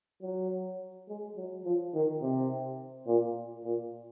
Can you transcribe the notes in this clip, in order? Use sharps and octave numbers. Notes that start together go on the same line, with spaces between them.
F#3
G#3
F#3
F3
D#3
C3
A#2
A#2